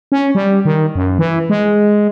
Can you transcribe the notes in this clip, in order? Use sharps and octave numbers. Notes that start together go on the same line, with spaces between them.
C#4
G3
D#3
F#2
E3
G#3